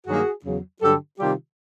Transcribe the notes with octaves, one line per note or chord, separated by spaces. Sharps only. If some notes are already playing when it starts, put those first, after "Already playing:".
G2 D#3 F#3 A#3 F#4 G#4
E2 C#3 F#3
G2 D3 F#3 G4 A4
C3 D#3 G3 F4 G4